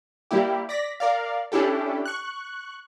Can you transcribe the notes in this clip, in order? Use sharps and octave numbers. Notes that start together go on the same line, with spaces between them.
G3 A#3 E4 G4
D5 A#6 B6
A#4 D5 F5
C#4 D4 E4 G4 A4
C#6 F#6